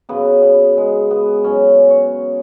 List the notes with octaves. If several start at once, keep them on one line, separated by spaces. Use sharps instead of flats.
F#2 C#3 F#3 B3
B3
G#3
B3
F#2 F#3 C#4
C#5